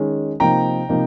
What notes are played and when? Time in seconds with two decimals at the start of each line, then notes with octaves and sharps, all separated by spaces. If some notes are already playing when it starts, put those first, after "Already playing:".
Already playing: D#3 G#3 C#4
0.40 C3 F3 A#3 D#4 G5 A#5
0.89 C3 F3 A#3 D#4